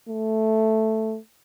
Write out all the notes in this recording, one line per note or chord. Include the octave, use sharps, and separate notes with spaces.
A3